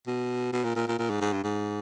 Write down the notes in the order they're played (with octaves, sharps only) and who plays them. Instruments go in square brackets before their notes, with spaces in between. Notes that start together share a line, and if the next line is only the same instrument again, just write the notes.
[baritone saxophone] B2
B2
A#2
A#2
A#2
A#2
G#2
G#2
G2
G#2